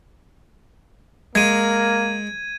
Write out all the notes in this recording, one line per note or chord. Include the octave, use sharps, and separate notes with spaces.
G#3 A#3 G#6 D#7